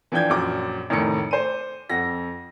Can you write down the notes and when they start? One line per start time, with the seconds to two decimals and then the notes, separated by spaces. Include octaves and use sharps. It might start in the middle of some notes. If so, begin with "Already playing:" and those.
0.12 E3 F3 D4 G5 G6 G#6
0.29 A#1 F#2 D6
0.90 F1 A2 D#3 C#7
1.31 C5 D#7
1.90 F2 F#5 A#6